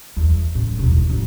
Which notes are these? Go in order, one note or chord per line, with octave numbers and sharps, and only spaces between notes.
E2
A2 C#3
B1 E2
A1